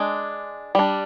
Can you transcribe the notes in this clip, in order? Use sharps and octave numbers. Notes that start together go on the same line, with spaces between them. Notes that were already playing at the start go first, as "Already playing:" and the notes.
Already playing: G#3 D4
G3 D4